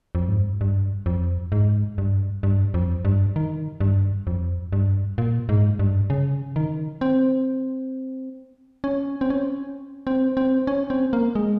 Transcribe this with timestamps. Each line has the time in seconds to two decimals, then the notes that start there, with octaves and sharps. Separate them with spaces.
0.15 F2
0.28 G#2
0.38 G2
0.61 G2
1.06 F2
1.52 G#2
1.98 G2
2.43 G2
2.74 F2
3.05 G2
3.36 D#3
3.81 G2
4.27 F2
4.73 G2
5.18 A#2
5.49 G#2
5.79 G2
6.10 C#3
6.56 D#3
7.01 C4
8.84 C#4
9.21 C4
9.30 C#4
10.07 C4
10.37 C4
10.67 C#4
10.90 C4
11.13 A#3
11.35 G#3